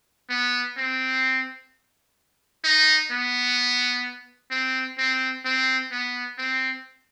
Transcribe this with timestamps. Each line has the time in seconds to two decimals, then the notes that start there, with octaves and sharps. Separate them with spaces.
0.30 B3
0.77 C4
2.64 D#4
3.11 B3
4.51 C4
4.98 C4
5.45 C4
5.91 B3
6.38 C4